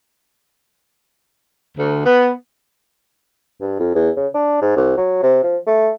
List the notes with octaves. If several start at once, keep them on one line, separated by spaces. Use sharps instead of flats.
D2
B3
G2
F2
E2
C#3
D4
G#2
C2
F#3
C3
F3
A3